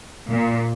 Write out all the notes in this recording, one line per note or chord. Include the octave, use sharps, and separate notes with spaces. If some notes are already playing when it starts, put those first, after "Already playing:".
A#2